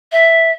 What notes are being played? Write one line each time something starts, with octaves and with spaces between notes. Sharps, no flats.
E5